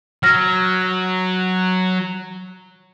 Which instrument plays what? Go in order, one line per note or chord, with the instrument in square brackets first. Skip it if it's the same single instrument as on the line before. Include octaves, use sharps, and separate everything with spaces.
[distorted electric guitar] F#3 [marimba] F6 A#6